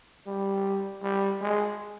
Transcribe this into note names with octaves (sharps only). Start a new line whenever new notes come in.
G3
G3
G#3